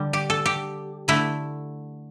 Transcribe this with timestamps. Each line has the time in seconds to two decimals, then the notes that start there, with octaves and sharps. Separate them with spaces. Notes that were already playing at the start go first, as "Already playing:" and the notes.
Already playing: D3 G3
0.13 G4
0.30 A4
0.46 G4
1.08 D3 A3 E4